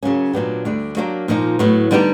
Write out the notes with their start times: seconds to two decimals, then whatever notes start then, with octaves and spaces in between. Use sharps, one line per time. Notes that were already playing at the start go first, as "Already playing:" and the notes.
0.03 C#3 F#3 A#3 C#4
0.33 A#2 F#3 B3 D4 G4
0.65 D2 D3 G3
0.97 F#3 A#3 D4 G4 A#4
1.28 A#2 F3 A#3 D#4
1.59 A2 F#3 B3
1.91 D3 G3 B3 D#4 G4